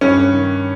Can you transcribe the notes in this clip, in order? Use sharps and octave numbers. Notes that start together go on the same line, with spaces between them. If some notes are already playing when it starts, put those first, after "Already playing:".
G2 C#4
D#3